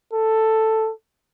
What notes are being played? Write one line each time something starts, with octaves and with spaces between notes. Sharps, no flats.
A4